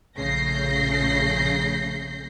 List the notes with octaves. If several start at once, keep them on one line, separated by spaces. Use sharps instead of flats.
A#1 C#3 A3 G6 A#6 C7